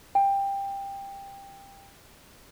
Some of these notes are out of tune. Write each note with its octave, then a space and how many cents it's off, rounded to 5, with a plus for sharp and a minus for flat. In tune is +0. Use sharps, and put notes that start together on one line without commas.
G5 +15